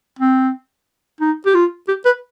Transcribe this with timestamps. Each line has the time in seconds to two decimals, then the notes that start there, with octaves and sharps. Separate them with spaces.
0.19 C4
1.21 D#4
1.46 G4
1.55 F4
1.88 G4
2.05 B4